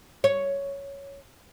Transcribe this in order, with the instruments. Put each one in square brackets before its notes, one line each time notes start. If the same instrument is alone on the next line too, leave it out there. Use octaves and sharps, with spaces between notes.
[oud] C#5